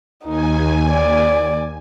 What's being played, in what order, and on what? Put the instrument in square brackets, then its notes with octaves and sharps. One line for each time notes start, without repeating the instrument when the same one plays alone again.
[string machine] D#2 G#5 [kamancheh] D#4
[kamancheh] D5